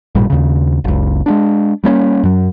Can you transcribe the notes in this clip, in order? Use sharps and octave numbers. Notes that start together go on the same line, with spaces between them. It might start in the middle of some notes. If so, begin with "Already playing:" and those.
A1 G2 A#2 G3
D#2 C#3
F#1 C#2
G#3 B3 D4
G3 A#3 B3 C#4
F#2 F#3